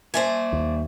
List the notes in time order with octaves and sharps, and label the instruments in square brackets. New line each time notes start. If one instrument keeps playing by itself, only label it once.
[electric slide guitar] A#3 E5 [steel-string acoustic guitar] C5 D5 G#5
[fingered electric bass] D#2